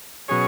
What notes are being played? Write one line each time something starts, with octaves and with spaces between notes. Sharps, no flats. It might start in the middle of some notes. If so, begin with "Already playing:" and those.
B2 F#3 C#4 G#4 C#5